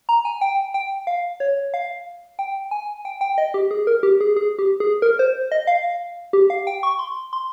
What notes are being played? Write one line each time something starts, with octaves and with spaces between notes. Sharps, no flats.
A#5
G#5
G5
G5
F5
C#5
F5
G5
G#5
G5
G5
D#5
G4
G#4
A#4
G4
G#4
G#4
G4
G#4
A#4
C5
D#5
F5
G4
F5
G5
C#6
C6
C6